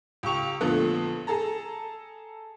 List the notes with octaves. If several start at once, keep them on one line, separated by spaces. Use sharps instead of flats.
C#2 G4 C#6 F7
F2 A#2 D3 A3 B3
G#4 A4 A5 A#5